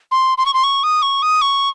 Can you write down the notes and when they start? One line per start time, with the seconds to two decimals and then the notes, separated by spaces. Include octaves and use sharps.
0.11 C6
0.38 C6
0.46 C#6
0.54 C6
0.63 C#6
0.83 D#6
1.02 C#6
1.22 D#6
1.41 C#6